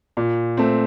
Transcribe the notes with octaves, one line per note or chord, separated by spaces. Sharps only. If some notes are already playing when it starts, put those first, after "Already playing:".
A#2
A3 C4